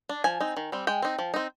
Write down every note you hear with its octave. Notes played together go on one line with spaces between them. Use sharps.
D4
F3 G#5
C4 D#4
D#3
G3 C4
G#3 G5
C4 D#4
F3
C4 D#4